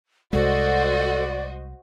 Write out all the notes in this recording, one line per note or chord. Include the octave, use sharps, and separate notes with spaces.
C2 G#3 F#4 A4 C5 D5 D#5